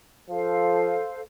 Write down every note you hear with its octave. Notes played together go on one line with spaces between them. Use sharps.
F3 A4 C5 F5